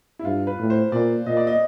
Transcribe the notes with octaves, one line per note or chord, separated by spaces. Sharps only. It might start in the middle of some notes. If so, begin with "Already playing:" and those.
E4
G2 F4
B4
A2
C5
A#2 D5
A#2 D#5
D5
D#5